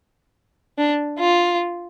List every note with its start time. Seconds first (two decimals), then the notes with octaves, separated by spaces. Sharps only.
0.78 D4
1.19 F4